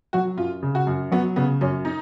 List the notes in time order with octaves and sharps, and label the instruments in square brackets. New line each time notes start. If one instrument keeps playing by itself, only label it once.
[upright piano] F#3 [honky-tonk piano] F#4
[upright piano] F#2 [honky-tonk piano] F4
[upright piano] C#3
[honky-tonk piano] F#4
[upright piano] F#2
[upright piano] F#3 [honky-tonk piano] B3
[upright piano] C#3 [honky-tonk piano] B3
[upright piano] F#2 [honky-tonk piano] C#4
[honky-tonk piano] D#4